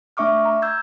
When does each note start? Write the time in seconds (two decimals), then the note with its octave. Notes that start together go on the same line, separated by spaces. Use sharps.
0.17 A3 D4 E5 C#6 D6 F6
0.45 A#5
0.62 E6 G6 G#6